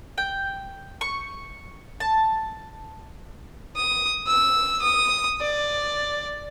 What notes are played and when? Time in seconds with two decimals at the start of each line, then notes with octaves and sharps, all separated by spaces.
0.18 G5
1.01 C#6
2.00 A5
3.76 D#6
4.27 E6
4.82 D#6
5.41 D5